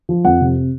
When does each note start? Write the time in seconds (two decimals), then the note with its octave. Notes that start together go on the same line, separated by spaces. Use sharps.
0.09 F3
0.25 F2 F#5
0.41 C3